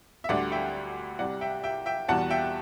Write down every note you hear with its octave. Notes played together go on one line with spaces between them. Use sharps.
E5
D2 D3 G3 D5 F#5
E5 G5
C2 C3 G3 D5 F#5
E5 G5
E5 G5
E5 G5
E2 B2 G3 F#5 A5
E5 G5